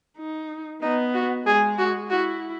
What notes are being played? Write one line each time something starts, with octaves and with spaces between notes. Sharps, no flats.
D#4
B3 D#4
F#4
G#3 G#4
F#4
E4 F#4